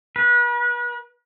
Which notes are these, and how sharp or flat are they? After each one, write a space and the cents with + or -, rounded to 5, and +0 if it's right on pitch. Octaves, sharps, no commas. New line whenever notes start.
B4 -35